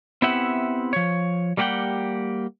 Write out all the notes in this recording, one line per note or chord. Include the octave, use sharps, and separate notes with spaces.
B3 C4 E4 G4 E5 F#5
F3 C#5
G3 A#3 G4 B4 F#5 G5